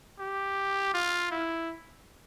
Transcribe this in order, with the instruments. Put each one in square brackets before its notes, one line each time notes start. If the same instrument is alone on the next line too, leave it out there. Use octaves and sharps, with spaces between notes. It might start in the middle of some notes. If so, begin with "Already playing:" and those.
[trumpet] G4
F4
E4